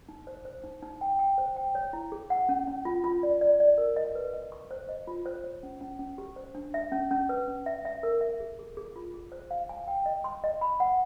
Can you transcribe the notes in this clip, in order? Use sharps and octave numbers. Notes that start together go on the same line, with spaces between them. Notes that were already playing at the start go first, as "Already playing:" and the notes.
D#4
C5
C5
D#4
D#4
G5
G5
C5
G5
C#5
E4
G#4
F#5
C#4
C#4
F4
F4
D5
D5
D5
A#4
D#5
B4
D#5
C#6
C5
D#5
F4
C5
C#5
C#4
C#4
C#4
G4
C5
D4
E5
C#4
C#4
B4
C#4
E5
E5
A#4
E5
G#4
G#4
G#4
F4
G#4
C5
F5
G#5
G5
D#5
C6
D#5
B5
F#5